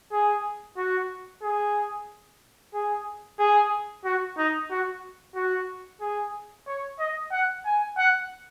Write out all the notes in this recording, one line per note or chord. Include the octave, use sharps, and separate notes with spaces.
G#4
F#4
G#4
G#4
G#4
F#4
D#4
F#4
F#4
G#4
C#5
D#5
F#5
G#5
F#5